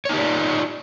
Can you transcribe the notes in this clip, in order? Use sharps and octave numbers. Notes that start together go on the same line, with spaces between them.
D#4 F4 G4 C#5 D5